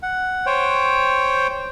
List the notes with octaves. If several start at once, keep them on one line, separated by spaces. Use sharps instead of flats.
F#5
C5 C#5 G5